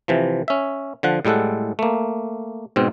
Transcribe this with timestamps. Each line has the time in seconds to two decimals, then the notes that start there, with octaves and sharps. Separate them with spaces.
0.08 C3 E3 F3
0.48 C#4 E5
1.03 D3 F3 F#5
1.25 A2 G3 G#3 A4 F#5
1.79 A3 A#3
2.76 G#2 B2 C4